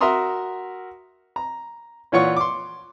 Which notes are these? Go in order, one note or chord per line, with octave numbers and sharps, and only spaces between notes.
F#4 A#4 E5 A#5 C6 D#6
A#5
A#2 E3 F4 C#5 F#5 C#6
C6 D6